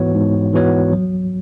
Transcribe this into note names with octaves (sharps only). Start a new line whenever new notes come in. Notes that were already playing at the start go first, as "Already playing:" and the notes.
Already playing: G#2 E3 B3 F#4 C#5
G#2
E3 B3 F#4 C#5
F#3